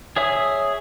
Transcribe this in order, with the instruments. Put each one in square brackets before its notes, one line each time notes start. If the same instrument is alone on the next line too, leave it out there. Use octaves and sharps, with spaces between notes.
[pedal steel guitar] G#4 C#5 E5 D#6